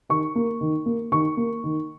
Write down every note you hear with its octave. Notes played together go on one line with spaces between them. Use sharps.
D#3 C#6
A#3
D#3
A#3
D#3 C#6
A#3
D#3